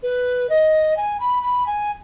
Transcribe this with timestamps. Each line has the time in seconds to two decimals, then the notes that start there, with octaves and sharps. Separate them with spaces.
0.03 B4
0.50 D#5
0.97 G#5
1.20 B5
1.43 B5
1.67 G#5